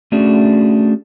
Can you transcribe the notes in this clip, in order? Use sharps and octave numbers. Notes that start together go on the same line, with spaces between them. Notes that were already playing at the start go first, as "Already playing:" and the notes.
A3 C#4 D4 F#4 G#4